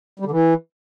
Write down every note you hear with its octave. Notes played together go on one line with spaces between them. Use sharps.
G3
D3
E3